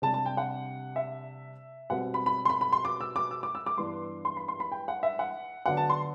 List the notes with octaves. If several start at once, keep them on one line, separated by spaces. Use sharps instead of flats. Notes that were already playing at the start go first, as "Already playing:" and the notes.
C3 G3 D4 A5
A5
G5
F#5
E5
B2 G3 C4 F#5
B5
B5
C6
B5
B5
C6
D6
E6
D6
E6
D6
E6
D6
G2 E3 B3 D4 C6
C6
B5
C6
B5
G5
F#5
E5
F#5
D3 F#3 B3 D4 F#5
A5
C6